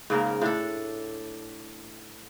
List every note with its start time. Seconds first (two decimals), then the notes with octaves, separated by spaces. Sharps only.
0.10 G#2 C#3 A#3 A#4
0.42 A2 D4 A4